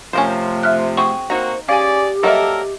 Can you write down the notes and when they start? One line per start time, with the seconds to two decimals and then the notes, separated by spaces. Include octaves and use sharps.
0.13 C3 F3 A3 C#4 A#4 C5
0.63 E5 F6 F#6
0.97 C4 F#4 G#4 C#6
1.30 A#3 C4 D#4 F#4 C5 A#5
1.69 C#4 G4 G#4 D5 F5 G#5
2.23 F#3 G3 A#3 A4 A#4 D#5 E5